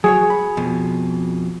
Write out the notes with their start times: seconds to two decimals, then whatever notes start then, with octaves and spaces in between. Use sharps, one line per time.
0.04 F#3 F#4 G#4 C#5
0.30 B5
0.57 F2 B2